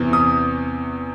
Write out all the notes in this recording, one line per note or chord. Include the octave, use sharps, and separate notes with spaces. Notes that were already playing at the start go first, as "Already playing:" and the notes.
Already playing: E2 C3 E3
D#6